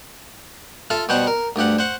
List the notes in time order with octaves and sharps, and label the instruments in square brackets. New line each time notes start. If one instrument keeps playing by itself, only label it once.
[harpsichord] F4 A4 E5 F5
B2 G3 G4 C5 F#5 C#6
A#4
D2 G2 G4 F#5
C5 F#5 C#6